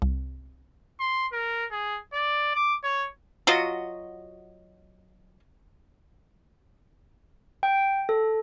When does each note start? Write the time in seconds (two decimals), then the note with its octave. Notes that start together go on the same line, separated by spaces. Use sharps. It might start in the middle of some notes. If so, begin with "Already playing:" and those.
0.02 C2
1.00 C6
1.33 A#4
1.71 G#4
2.13 D5
2.55 D6
2.84 C#5
3.47 F#3 F4 F#4 D#5
7.63 G5
8.09 A4